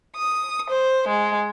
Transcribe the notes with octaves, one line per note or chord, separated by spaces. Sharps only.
D#6
C5
G#3